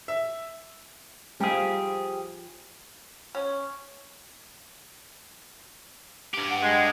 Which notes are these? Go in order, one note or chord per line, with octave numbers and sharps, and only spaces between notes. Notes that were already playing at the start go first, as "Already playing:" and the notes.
E5
F3 G3 D#4 F4 G4 G#4
C#4
G2 G4
F#5
G#3